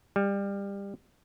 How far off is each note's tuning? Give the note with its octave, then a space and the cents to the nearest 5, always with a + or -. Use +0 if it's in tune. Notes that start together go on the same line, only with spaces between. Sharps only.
G3 +25